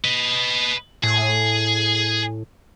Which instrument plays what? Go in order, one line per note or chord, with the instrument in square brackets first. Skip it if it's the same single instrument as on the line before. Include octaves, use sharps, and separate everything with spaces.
[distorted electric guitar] B4 D#5
[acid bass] A2 [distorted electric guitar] G#4